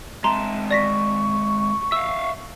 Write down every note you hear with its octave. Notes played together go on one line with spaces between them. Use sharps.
G#3 C4 E5 A5 A#5 C6
D5 C#6 A#6 B6
E5 F5 E6